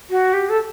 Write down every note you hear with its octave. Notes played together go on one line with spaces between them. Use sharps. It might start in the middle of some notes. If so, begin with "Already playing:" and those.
F#4
G4
A4